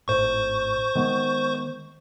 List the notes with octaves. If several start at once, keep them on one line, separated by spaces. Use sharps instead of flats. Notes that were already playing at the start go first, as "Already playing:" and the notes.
G#1 A2 C5 C#6
D#3 G#3 B3